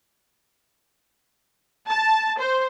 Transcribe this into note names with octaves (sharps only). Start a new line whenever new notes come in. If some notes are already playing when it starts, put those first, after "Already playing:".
A5
C5